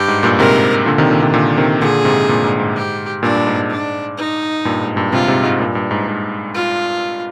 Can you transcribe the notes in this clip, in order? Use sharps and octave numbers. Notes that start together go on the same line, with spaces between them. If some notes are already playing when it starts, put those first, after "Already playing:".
Already playing: G2 G4
G#2
G2 A#2
G#2 C3 A#4
A#2 D3
C3 D#3
A#2 D3
C3 D#3
A#2 D3
C3 D#3
A#2 D3 G#4
G#2 C3
G2 A#2
G#2
G#2
G4
G2 A#2 D4
G2
G#2
G#2
D4
D#4
G2 A#2
G#2
G2 A#2
G#2 C3 F4
G#2 C3
G#2
G2 A#2
G2
G#2
G#2
F4